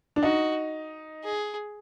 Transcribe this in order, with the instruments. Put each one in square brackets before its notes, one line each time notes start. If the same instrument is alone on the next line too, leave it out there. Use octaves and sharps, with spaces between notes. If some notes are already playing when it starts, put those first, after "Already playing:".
[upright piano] D4
[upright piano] D#4 [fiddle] F#4
[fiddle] G#4